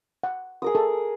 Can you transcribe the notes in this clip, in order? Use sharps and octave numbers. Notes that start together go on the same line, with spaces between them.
F#5
G#4 A#4 D#6
A4